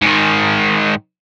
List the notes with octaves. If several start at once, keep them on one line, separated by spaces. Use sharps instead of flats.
G#2 D#3